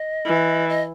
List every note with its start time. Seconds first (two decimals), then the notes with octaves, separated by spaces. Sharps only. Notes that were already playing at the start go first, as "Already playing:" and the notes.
Already playing: D#5
0.26 E3
0.69 D#5